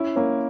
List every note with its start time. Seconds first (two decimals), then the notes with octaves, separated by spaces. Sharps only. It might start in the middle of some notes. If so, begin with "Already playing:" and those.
Already playing: C#4 E4
0.16 A#3 C#4